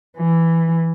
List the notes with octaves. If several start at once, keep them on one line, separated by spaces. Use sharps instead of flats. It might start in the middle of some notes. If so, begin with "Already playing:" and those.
E3